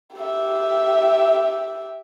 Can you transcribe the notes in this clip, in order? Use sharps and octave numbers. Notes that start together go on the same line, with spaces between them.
G4 E5